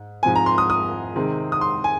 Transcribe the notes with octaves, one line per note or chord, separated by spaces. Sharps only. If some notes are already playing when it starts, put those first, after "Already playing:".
Already playing: G#2
G#2 F3 C4 G#5
A#5
C6
D#6
D#6
C3 D#3 G#3 C4
D#6
C6
G#5